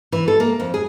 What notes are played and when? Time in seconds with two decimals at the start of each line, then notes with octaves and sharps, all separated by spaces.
0.12 E3
0.28 A4
0.40 A#3
0.60 F2
0.74 G#4